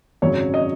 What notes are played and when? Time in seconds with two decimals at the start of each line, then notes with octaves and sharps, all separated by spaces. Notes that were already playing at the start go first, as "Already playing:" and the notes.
0.22 G#1 F#2 C#3 F#3 C#5
0.54 D#5